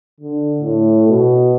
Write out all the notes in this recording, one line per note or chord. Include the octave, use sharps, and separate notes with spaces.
D3
A2
B2